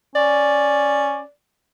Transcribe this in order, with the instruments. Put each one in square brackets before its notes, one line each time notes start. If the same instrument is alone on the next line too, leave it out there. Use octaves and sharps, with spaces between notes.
[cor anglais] C#4 [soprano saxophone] D5